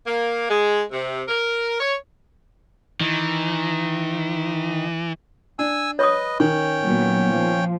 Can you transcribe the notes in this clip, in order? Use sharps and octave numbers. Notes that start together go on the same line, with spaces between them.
A#3
G#3
C3
A#4
C#5
D#3 E3
D4 G#5 E6
B4 C#5 D#5 C#6 D#6
D#3 C#4 G5 C#6
A#2 F#3 B3
F3